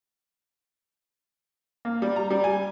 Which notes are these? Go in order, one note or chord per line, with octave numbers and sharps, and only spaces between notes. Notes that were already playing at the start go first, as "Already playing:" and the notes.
A#3
G3
A#5
G3
G#5